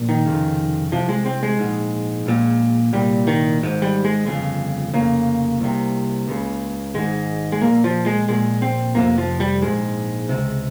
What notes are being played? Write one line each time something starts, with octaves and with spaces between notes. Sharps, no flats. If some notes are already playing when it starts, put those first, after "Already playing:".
Already playing: A#1 A#2
D#3
F1 F2 C#3
C2 C3 F3
G#3
C4
G#3
A#1 G#2
A#1 A#2
C2 A#2 G3
D#3
G#1 G#2
G3
G#3
G1 F2 C#3
F1 F2 C#3 A#3
C2 C3
C#2 C#3
G#1 G#2 G#3
G#3
A#1 A#2 A#3
F3
G#3
A#1 A#2 G#3
C4
F1 F2 C3 A#3
F3
G3
A#1 G#2 G#3
C#2 C3